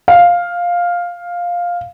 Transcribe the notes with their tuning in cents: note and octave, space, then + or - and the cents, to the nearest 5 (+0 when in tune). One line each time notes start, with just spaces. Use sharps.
F5 +5